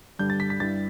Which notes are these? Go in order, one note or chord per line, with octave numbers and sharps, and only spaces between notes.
G2 D3 G3 D4 G6
A6
B6
B6
G2 G3 E4 A6